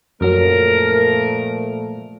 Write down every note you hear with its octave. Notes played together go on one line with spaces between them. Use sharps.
F#2 A#2 F3 F#3 A3 A#4